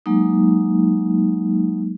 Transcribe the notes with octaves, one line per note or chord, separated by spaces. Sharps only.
F#3 G#3 A#3 D#4